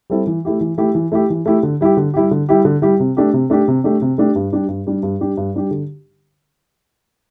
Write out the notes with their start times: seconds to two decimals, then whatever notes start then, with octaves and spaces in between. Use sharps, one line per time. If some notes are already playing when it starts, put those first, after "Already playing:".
0.10 G3 C4 E4 A4
0.27 E3
0.45 A3 E4 G4
0.61 E3
0.78 A3 E4 G4
0.95 E3
1.12 A3 E4 G4
1.30 E3
1.46 A3 E4 G4
1.63 D3
1.81 G3 E4 G4
1.97 D3
2.14 G3 E4 G4
2.31 D3
2.49 G3 E4 G4
2.65 D3
2.82 G3 E4 G4
3.00 C3
3.17 A3 D4 G4
3.33 C3
3.50 A3 D4 G4
3.68 C3
3.84 A3 D4 G4
4.02 C3
4.18 A3 D4 G4
4.36 G2
4.52 G3 D4 G4
4.68 G2
4.87 G3 D4 G4
5.03 G2
5.20 G3 D4 G4
5.37 G2
5.54 G3 D4 G4
5.71 D3